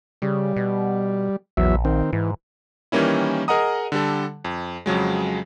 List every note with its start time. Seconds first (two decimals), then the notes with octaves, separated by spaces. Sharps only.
0.22 C#3 G3
0.56 B2
1.57 A#1 E2 F#3 E5
1.85 D#3 C4
2.13 G#2 E3
2.92 D#3 E3 G3 A#3 C#4 E4
3.48 G#4 A#4 D#5 F#5 A#5 D#6
3.92 D3 G3 A4
4.45 F2
4.86 F2 C#3 F#3 G#3